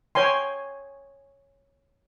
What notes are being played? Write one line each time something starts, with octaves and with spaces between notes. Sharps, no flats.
C#5 G5 G#5 C6